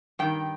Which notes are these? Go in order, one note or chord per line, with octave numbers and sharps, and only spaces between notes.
G2 D#3 G5